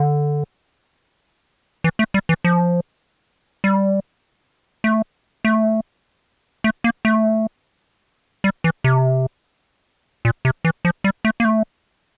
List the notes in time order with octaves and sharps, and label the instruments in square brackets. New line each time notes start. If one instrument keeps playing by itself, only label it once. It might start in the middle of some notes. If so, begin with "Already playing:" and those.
Already playing: [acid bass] D3
E3
A3
G3
E3
F3
G3
A3
A3
A3
A#3
A3
G3
E3
C3
A#2
C3
E3
F3
G3
A3
A#3
A3